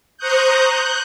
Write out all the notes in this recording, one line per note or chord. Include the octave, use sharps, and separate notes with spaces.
C5 A#5 C#6 D#6 F#6 G6
F#6 G6